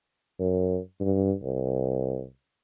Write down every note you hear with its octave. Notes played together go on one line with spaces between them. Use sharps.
F#2
G2
C2